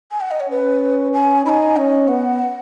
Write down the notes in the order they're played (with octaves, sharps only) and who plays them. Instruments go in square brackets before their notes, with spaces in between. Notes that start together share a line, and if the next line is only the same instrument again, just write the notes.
[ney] G#5
F#5
D#5
C#5
[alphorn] C#4 [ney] B4
[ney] G#5
[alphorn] D#4 [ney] B5
[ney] G#5
[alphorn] C#4 [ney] D#5
[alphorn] B3 [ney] F#5